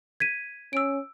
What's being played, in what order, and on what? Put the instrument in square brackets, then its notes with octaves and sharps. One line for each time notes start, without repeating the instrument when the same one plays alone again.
[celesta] G#6 B6 D#7
[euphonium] C#4 [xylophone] E6 D7